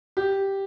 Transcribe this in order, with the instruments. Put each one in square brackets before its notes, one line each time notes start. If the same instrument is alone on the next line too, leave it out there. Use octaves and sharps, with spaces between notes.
[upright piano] G4